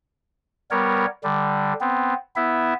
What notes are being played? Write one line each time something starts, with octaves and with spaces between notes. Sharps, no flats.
G3 B3 A#4 C#5
D3 G3
B3 C4
B3 E4 E5